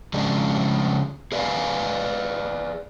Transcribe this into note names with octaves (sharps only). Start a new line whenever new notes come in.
C#3 F3 G#3 D4
G#4 B4 D5 D#5 F5 G#5